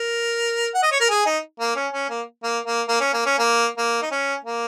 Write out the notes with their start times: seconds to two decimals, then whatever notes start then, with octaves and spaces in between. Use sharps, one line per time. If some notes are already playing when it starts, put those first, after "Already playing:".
Already playing: A#4
0.74 F#5
0.83 D#5
0.92 C#5
1.00 A#4
1.10 G#4
1.26 D#4
1.60 A#3
1.76 C#4
1.93 C#4
2.10 A#3
2.43 A#3
2.66 A#3
2.88 A#3
3.01 C#4
3.13 A#3
3.26 C#4
3.39 A#3
3.77 A#3
4.02 D#4
4.11 C#4
4.44 A#3